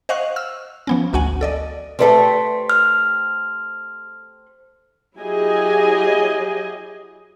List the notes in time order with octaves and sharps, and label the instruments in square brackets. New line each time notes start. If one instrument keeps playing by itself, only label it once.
[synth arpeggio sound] C5 D#5 F5 F#5 C#6 F#6
E6 F6
F3 B3 C#4
G#1 D2 F#4 F#5 G#5
A4 D5 D#5
[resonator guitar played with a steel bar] A3 C4 [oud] G4 B4 D5
[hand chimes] F6
[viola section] F#3 E4 G4 G#4 D#5 G#5